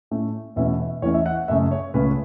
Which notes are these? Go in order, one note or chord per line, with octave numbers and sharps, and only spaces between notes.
A2 A3 C#4
E2 B2 A3 C#4 E5
E5
E2 E3 A3 C#4 C#5
E5
F#5
F#2 C#3 A3 C#4 E5
C#5
C#2 C#3 A3 C#4 B4